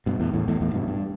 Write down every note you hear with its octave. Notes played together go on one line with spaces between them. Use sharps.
G2 B2
E2 A2
E2 A2
E2 A2
E2 A2
G2 B2
G2